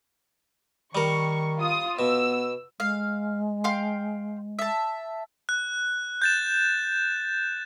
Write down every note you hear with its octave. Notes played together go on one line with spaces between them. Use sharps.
D#3 G3 A#4 C#6
F4 D#6
B2 B3 E6
G#3 F5
F5 G5 C6
E5 A5
F#6
G6 A6 E7